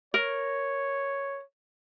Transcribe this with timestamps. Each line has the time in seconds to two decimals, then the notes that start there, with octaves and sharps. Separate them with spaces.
0.14 A#4 C#5